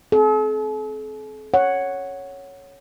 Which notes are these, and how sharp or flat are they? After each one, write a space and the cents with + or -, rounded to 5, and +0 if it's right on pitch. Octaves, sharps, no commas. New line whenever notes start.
C4 +0 A4 -45
C#5 +0 F#5 +0